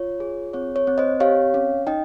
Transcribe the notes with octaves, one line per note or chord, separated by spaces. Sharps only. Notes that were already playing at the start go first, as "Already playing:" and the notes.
Already playing: F4 C#5
G#4
C4 C#5
C#5
C4
C5 D#5
G4 C#5 F5
C#4
D#4 D#5 G5